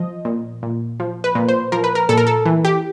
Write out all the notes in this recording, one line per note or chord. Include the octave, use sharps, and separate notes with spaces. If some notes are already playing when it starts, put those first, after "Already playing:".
Already playing: F3 D#5
A#2
A#2
F3
B4
A#2
C5
F3 A#4
B4
A#4
A#2 A4
A#4
A4
E3
G4